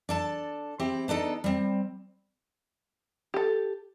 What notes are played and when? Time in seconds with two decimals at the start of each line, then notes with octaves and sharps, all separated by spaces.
0.09 D4 A4 A5
0.79 C4 E4 G4
1.08 B3 D4 D#4 A4
1.44 G3 C4
3.34 G4 A4